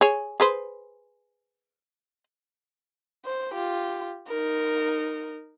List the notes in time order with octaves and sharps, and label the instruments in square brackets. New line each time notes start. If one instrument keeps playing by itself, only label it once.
[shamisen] G#4 C#5
G#4 B4 C5
[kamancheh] C5
F4 G4
D#4 A#4